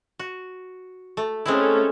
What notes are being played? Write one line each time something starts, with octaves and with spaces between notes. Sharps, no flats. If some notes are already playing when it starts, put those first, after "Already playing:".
F#4
A3
G#3 A3 C4 C#4 E4 A4